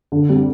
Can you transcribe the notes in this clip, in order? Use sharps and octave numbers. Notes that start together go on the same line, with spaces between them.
D3
G3 C4